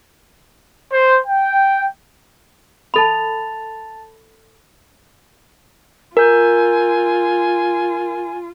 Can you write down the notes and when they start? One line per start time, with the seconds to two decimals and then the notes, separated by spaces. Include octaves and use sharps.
0.91 C5
1.27 G5
2.94 A4 A5 B5 A6 F7
6.17 F4 A#4 G#5 G6